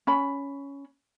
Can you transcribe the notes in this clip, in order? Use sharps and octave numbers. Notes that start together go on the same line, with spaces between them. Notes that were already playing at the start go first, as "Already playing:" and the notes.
C#4 B5